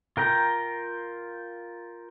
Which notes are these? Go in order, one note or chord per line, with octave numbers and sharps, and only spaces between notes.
F4 A#4 G5 A#5